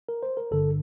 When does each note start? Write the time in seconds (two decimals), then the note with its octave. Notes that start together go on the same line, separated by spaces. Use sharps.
0.09 A#4
0.23 C5
0.37 A#4
0.51 G1 G2 D3 A4